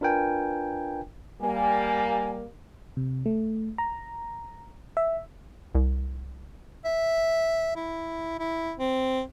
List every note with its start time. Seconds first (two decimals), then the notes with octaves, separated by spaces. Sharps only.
0.01 D4 F4 A#4 B4 G5 G#5
1.41 G3 A#3 G#5
2.97 C3
3.26 A3
3.78 A#5
4.97 E5
5.75 C2
6.85 E5
7.76 E4
8.39 E4
8.78 C4